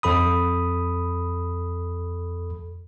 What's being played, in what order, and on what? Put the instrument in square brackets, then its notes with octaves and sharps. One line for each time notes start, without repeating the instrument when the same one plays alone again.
[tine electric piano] F2 A4 B5 D#6